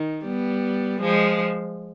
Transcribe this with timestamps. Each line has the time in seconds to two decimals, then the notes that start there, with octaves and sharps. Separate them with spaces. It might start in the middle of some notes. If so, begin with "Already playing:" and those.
Already playing: D#3
0.24 G3 B3
1.01 F3 G#3